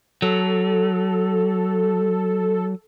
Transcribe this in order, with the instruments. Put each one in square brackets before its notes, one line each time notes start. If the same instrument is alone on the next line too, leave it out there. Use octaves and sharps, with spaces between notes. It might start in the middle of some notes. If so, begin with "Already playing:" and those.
[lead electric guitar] F#3 [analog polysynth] A4